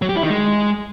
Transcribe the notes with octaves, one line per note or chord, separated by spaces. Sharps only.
F#3
G4
E4
D#3
G#3